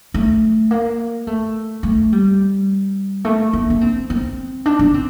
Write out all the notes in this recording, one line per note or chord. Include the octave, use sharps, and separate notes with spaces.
A3
A#3
A3
A3
G3
A3
A#3
D4
C4
C4
D4
D4
C4